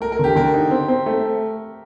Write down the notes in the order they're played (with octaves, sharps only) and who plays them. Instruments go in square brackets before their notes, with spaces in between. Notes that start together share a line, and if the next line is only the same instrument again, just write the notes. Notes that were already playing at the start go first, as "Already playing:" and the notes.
[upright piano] A3 [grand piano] A#4
[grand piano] A#4
[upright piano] D3 [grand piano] G4
[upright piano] D3 [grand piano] A#4
[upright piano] D#4
C4
C4
A3